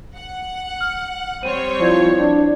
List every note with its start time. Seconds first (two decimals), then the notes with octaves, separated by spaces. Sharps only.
0.15 F#5
0.81 F6
1.43 G3 C4 C5 C#5 D#7
1.80 F3 E4 D5 G#6
2.19 D4